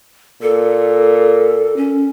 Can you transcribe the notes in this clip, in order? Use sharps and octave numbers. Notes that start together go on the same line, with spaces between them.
A#2 A4
C#4